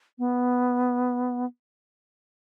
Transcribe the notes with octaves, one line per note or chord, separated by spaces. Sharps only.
B3